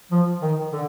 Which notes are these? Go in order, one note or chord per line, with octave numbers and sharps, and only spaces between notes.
F3
D#3
D3